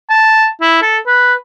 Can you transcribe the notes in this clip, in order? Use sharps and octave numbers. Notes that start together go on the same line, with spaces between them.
A5
E4
A4
B4